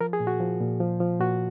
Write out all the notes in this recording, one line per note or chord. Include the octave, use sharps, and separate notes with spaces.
F3 A#4
G#4
A#2
F#4
F3
A#2
F3
F3
A#2 F#4